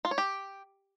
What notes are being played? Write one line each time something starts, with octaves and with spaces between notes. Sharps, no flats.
F4
C#5
G4